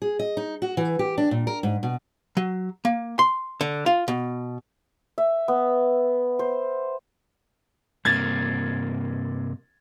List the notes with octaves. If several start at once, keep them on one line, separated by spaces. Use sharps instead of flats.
G#4
D#5
D#4
F#4
E3
G4
D4
A#2
A#4
G#2
B2
F#3
A#3
C6
D3
F4
B2
E5
B3
C5
G2 C3 A#3 G#6 A6